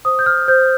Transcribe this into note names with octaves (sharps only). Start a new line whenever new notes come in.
C5 D#6
G6
F6
C5 G6